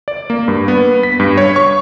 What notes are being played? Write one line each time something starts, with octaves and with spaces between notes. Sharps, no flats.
D5
A#3
G2
B3
B6
G2
C#5
C#6